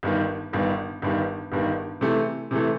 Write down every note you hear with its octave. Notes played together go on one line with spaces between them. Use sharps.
G1 G2 D#3
G1 G2 D#3
G1 G2 D#3
G1 G2 D#3
C3 E3 A3
C3 E3 A3